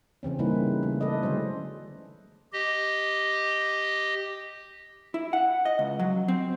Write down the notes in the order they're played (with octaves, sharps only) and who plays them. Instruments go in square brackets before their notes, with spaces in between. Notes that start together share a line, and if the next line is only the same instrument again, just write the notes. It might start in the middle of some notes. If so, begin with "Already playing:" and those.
[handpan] C#3 E3 C4 C#4
C#3 G3 A#3 D#4 E4 B4
A3
A4 B4 D5 D#5
D3 F#3 G#3 C#4 C5
[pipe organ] G4 D#5
[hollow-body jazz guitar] E4
F#5
D#5
C#2
F#3
C4